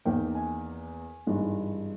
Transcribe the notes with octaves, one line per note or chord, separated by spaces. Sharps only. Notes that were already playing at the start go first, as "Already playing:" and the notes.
E2 D#3 A#3 G5
G#5
G#1 G2 E3 G#3